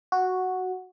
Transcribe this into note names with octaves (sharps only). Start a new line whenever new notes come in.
F#4